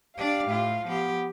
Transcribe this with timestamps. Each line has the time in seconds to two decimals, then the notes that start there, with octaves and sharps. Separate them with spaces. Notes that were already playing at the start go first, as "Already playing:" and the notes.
0.17 D4 G4 D5 F5
0.47 A2 F4
0.86 F3 B3 G4